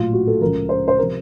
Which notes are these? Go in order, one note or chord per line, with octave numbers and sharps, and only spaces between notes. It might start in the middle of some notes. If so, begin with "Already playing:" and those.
Already playing: A#1 A2 F#3 F4
F#4
A4
C#2 C#3 F3 A#4
C5
C5
C3 F3 A#4